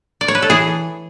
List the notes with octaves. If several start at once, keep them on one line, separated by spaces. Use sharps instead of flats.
D5
C#5
B4
A4
E3 G#4